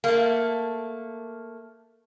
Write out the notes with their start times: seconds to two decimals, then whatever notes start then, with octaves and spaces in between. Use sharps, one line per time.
0.04 A3 A#3